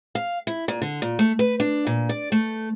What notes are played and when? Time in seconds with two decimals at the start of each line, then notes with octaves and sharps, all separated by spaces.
0.15 F5
0.47 E4
0.68 A#2
0.82 D3
1.02 A#2
1.19 A3
1.39 B4
1.60 D4
1.87 A#2
2.09 D5
2.32 A3